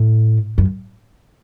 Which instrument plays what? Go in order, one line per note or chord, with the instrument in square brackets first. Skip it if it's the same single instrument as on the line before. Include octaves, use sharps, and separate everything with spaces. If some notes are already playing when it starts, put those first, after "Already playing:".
Already playing: [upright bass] A2
F#2